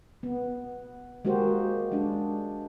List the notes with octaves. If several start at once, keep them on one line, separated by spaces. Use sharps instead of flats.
B3
G#3 A#3 F#4 G4 C5
G#3 D4